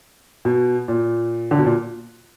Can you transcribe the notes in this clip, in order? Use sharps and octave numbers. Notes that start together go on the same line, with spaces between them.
B2
A#2
D3
B2
A#2